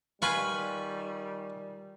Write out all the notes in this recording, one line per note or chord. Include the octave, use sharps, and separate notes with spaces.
D#3 G3 F4 B4 G#5 B5 C#6